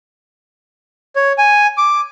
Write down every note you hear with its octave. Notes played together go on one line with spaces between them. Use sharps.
C#5
G#5
D6